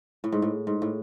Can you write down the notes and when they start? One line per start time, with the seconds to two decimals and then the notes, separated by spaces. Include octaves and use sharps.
0.24 A2
0.32 G#2
0.42 A2
0.67 G#2
0.82 A2